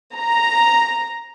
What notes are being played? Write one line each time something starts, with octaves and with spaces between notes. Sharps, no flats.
A#5